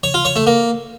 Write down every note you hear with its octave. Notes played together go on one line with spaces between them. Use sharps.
C#5
F4
C#5
A3
A#3